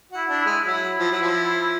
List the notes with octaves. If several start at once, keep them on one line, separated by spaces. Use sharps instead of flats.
E4 F#4
D4
G#3 E4
F#3 E4
F3
F#3
F3